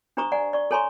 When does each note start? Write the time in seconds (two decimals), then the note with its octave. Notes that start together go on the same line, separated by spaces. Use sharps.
0.17 D4 G4 C5 A#5 C#6 D#6
0.32 D5 F#5 G#5 A#5
0.53 D5 C#6
0.71 A4 C#5 G#5 A#5 C6 C#6